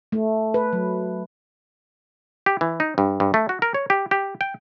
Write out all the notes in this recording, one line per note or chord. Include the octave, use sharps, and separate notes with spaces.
A3
B4
F#3
G4
E3
D#4
G2
G2
A3
F#4
A#4
C#5
G4
G4
G5